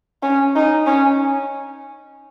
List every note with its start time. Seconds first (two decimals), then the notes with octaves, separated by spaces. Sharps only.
0.23 C#4
0.55 D#4
0.87 C#4